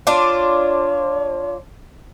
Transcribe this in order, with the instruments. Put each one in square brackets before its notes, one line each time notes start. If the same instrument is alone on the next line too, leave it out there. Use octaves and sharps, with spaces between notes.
[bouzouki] D4 F4 [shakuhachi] C#5